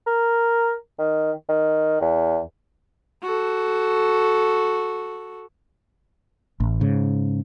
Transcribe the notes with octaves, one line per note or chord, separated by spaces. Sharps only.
A#4
D#3
D#3
E2
F#4 A4
A1
G#2 C#3